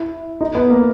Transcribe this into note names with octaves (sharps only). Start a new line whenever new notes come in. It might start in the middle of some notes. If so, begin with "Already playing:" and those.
Already playing: E4
D#4
B3
A#3